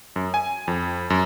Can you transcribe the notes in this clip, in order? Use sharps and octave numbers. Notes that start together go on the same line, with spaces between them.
F#2
G#5
F2
F#2